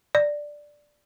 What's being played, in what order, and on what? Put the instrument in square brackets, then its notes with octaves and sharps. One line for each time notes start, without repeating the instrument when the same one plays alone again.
[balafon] D5